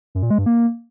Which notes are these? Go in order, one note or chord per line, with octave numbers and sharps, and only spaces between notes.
F#2
A#2
G#3
G2
A#3